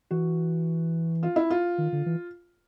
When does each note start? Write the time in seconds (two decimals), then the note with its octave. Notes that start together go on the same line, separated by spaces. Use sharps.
0.11 E3 F#4
1.23 F4
1.36 E4
1.50 F4
1.78 D#3
1.93 D3
2.06 E3